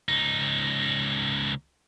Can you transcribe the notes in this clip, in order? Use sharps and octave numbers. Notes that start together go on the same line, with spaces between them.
C#2 D#4